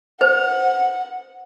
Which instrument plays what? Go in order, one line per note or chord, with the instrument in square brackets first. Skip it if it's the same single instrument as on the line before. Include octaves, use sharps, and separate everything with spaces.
[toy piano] B4 C5 [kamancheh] F#5